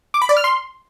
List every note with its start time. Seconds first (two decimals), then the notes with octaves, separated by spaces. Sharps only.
0.14 D6
0.22 B5
0.29 D5
0.37 F6
0.44 C6